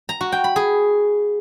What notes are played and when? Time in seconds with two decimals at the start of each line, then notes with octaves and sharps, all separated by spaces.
0.09 A#5
0.21 F#4
0.32 G5
0.44 B5
0.56 G#4